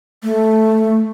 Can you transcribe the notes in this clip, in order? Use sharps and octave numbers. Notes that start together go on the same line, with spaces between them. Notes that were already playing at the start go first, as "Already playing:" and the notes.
A3